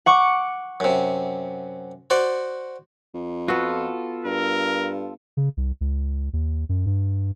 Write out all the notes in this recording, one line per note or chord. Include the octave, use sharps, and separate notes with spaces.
F#5 C#6 D6
F#2 C3
F#4 C5 D5
F2
B3 F4 F#4 A4
G2 A#4
C#3
C2
C#2
D#2
F#2
G2